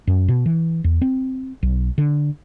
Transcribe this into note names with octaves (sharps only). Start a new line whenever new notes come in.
F#2
B2
E3
E2
C4
B1
D3